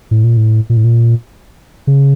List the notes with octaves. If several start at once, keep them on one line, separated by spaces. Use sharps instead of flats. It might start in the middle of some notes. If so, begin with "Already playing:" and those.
A2
A#2
A2
A#2
A2
A#2
C#3